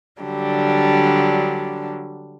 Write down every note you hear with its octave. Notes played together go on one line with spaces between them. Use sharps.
D3 F#3 G3 D4